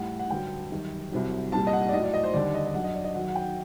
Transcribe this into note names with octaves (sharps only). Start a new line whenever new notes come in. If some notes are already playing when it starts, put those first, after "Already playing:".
Already playing: A2 G3 F#5
F#5
G2 D3 F#3 G5
F#2 D#3 G3
C2 C3 F#3
C2 A#2 G3 A5
D#5
F#5
D5
A2 F#3 D#5
D5
D#5
C5
D#2 D3 G3 D5
D#5
D#5
F#2 D3 F#3 F#5
D#5
D5
D#5
F#2 D#3 F#3 F#5
F#5
G5